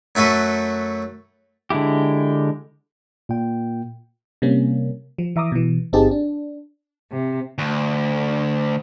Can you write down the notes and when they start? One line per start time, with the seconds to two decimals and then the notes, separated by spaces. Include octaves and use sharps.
0.15 F#2 A3 F#4 A4 B4
1.70 D3 G#3 E4 G4
3.29 A#2 G5
4.42 C3 G3 A#3 C#4
5.18 F3
5.36 E3 E5 A#5 D6 D#6
5.52 B2 E3
5.93 G1 C4 D#4 G4 G#4 A5
6.11 D4
7.11 C3
7.58 D2